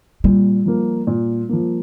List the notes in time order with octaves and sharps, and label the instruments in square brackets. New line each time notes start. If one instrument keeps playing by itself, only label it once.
[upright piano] A#2 [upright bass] G3
[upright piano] F3 A#3
A#2
F3 A#3